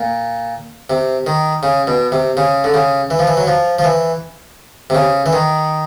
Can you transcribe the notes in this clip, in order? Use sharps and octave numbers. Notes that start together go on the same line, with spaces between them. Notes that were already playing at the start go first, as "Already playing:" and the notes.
Already playing: A#2
C3
D#3
C#3
B2
C3
C#3
D3
C#3
E3
F3
E3
F#3
F3
F3
E3
C3
C#3
E3
D#3